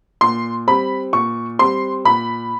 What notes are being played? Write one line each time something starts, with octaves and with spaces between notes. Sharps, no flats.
A#2 C6
G3 C4 B5
A#2 C#6
G3 C4 C6
A#2 B5